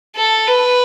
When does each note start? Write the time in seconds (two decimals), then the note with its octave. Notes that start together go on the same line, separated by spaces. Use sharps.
0.16 A4
0.47 B4